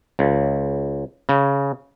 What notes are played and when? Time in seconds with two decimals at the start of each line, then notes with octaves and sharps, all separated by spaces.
0.19 C#2
1.29 C#3